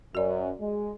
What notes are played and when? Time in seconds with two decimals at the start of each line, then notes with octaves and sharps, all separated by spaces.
0.15 F#2 F#4 D5
0.59 G#3